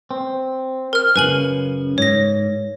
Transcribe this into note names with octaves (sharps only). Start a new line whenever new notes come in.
C4
A#4 F6
F#2 A#2 C#3 B4 G#5 F#7
G#2 C#5 A#6